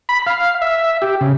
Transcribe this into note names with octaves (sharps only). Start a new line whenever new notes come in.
B5
F5
E5
G4
C#3